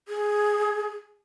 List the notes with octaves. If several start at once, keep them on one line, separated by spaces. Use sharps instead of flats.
G#4